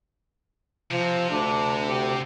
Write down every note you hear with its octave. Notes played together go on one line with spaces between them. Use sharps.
C3 F3
D2 D4
G4